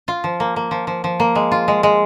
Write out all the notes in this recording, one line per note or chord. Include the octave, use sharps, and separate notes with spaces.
F4
F3
A#3
A#3
F3
F3
F3
A#3
G#3
F4
G#3
G#3